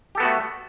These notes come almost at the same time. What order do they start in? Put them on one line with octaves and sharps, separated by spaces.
G4 A4 B3 F#4 A3